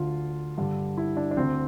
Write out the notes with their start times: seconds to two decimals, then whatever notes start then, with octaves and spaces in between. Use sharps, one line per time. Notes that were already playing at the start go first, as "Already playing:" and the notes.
Already playing: D2 D3 F4
0.58 G2 D3
0.97 E4
1.17 D4
1.31 D4
1.37 D2 D3 C4